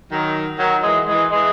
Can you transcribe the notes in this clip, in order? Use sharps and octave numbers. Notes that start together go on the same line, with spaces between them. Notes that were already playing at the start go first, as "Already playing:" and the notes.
D#3 F#3
D#3 F#3
E3 G#3
E3 G#3
E3 G#3